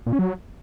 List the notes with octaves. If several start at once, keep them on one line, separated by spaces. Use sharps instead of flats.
A#2
C#4
F#3